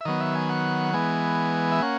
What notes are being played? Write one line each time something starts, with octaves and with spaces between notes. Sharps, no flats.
E5
D#3 F#3 B3 D#5
E5
G#5
F#5
E3 G#3 B3 G#5
E5
A#3 C#4 F#5